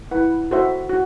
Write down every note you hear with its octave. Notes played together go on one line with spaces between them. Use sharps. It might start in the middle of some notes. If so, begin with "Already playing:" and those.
E4 B4 F#5
F#4 A4 C5 E5
F#4